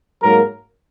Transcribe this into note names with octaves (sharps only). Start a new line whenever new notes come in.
G#2 F#3 A#3 A#4